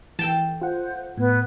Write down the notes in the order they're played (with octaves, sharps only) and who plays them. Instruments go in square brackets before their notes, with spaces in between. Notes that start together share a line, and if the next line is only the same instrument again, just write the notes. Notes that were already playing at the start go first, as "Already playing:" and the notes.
[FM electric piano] E3 [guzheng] A4 G5 A5
[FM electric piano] F4 F#5 [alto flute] C5
[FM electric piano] A2 [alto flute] B3